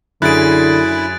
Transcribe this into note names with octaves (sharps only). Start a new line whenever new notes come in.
F#2 D3 E4 G#4 F#6 A6 D7